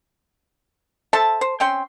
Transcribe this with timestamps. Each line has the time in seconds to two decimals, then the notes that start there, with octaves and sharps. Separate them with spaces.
1.13 A4 C5 E5 A5
1.41 C5
1.60 C4 C#4 G5 C6